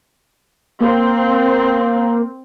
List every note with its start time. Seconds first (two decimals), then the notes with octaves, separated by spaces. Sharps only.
0.80 A#3 C4